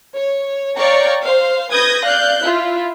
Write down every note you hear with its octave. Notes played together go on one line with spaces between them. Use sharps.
C#5
C#5 D5 F5 G5 A#5 C#6
C5 F5
B4 D#6 G6 G#6 A#6
D5 F5 F#6 G6
E4 F4 E5